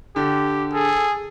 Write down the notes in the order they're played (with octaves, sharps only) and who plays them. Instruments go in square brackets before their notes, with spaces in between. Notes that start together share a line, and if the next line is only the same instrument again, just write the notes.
[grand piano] D3 [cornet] G4
[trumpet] G#4 [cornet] A4